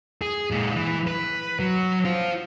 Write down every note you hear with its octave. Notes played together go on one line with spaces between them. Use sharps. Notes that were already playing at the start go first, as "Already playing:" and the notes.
G#4
A#2 G#3
E3
B4
F#3
F4 C5